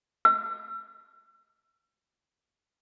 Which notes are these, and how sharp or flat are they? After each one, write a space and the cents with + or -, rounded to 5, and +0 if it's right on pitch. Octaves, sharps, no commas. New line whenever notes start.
E6 +40